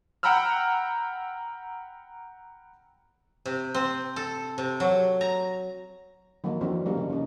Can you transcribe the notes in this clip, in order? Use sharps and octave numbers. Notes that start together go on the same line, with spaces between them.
F#5 G5 A#5 B5 E6 F6
C3
C4
A4
C3
F#3
A#5
D#3 F3 F#3 A#3 D#4
E3 F3 C4 D4 F#4 A#4
G3 A#3 C4 D4 D#4 A#4
C#3 A#3
C#3 D#4